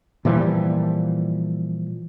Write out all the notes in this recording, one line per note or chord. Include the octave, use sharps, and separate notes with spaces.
A#2 E3 F3 G3